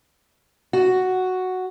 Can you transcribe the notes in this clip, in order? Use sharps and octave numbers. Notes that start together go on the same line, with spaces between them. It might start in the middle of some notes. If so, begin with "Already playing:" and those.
F#4